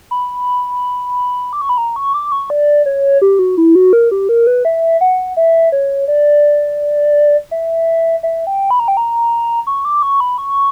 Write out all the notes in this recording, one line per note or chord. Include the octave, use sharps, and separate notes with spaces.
B5
D6
C#6
B5
A#5
C#6
D6
C#6
D5
C#5
G4
F#4
E4
F#4
A#4
G4
A#4
B4
E5
F#5
E5
C#5
D5
E5
E5
G5
B5
A#5
G5
A#5
C#6
D6
C#6
B5
C#6